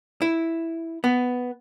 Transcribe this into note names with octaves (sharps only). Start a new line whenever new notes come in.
E4
B3